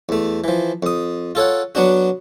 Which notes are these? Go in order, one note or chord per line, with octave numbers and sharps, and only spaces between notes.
E2 A3
E3 F3
F2 D#6
F4 A4 C#5 F#5
F#3 B3 D4 F#4